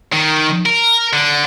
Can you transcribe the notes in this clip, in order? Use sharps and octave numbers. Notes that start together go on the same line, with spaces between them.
D#3
A#4
D3